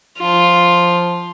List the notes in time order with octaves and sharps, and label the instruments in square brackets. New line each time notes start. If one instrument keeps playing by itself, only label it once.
[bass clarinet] F3 [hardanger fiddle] F4